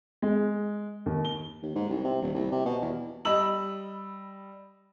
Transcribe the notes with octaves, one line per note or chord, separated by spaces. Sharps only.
G#3
D#2
G7
D#2
G#2
C2
C3
D#1
C2
C3
B2
E2
G3 D#5 B5 E6 F#7